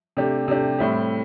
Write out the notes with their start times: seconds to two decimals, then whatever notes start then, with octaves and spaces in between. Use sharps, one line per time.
0.17 C3 A3 D4 G4
0.48 C3 A3 D4 G4
0.78 A2 G3 C4 E4 G4